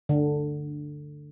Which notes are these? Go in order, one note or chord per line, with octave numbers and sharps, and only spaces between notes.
D3